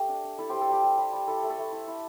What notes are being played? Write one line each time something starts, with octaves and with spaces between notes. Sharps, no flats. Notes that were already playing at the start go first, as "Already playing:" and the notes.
Already playing: A3 G4
D4
D4
E4 A4
G3 G4 C5
A4
G3 G4
G3
G3
G3
E4 A4
A3
A4
A3
E4
E4